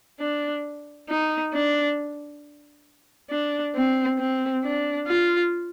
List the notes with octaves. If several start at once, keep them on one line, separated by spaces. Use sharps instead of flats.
D4
D#4
D4
D4
C4
C4
D4
F4